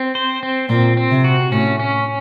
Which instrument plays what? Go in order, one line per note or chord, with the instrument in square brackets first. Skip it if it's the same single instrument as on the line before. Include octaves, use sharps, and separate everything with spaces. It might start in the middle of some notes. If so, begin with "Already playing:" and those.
Already playing: [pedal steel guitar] C4
C5
C4
[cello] A#2 [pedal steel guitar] C4
[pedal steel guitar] C4
[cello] C3
[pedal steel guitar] F#4
[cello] A2 [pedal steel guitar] C#4
[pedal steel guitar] C#4